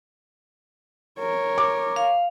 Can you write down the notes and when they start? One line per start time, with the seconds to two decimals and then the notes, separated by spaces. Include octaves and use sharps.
1.19 A#4 C#5
1.58 D6
1.96 F5